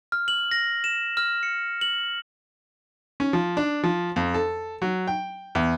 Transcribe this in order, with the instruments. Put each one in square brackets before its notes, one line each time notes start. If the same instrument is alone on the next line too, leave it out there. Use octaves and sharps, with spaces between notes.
[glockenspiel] F6
F#7
A#6
E7
F6
C#7
F#7
[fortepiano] C#4
F3
D4
F3
F2
A4
F#3
G5
E2